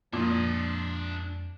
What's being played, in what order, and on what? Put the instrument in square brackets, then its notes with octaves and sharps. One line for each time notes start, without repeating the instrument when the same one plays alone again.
[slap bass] F2 G#3 [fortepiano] A#2 [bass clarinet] F3 [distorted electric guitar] D4 D#5